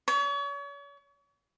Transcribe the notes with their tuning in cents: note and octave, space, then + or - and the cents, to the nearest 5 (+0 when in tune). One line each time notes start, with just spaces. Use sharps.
C#5 +40